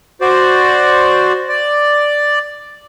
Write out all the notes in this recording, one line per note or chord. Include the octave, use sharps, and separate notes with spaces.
F#4 C5 D5
D5